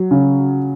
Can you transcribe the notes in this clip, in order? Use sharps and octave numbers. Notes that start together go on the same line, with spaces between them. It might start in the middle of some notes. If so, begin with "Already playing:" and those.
Already playing: F#3
C#3